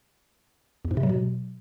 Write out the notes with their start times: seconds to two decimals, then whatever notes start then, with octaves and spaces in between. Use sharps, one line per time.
0.85 E2
0.91 G#2
0.97 C3
1.03 F#3
1.09 B2